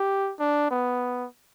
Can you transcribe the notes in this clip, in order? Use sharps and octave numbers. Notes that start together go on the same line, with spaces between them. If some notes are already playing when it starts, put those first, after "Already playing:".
Already playing: G4
D4
B3